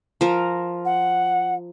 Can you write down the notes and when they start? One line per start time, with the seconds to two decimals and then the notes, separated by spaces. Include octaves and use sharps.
0.21 F3 A#4
0.85 F#5